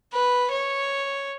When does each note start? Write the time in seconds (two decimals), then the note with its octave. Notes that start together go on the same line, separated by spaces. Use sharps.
0.13 B4
0.51 C#5